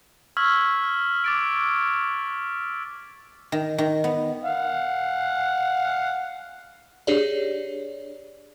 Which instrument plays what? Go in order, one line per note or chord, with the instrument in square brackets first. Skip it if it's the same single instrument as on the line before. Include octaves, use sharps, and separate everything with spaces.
[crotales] C#6 E6 F6 G#6 B6 F#7
D6 A6 D7
[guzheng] D#3
D#3
B3
[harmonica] F5 F#5
[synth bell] D4 G4 G#4 C#5 D5